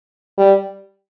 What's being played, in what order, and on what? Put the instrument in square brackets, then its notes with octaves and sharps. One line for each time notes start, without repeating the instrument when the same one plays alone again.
[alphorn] G3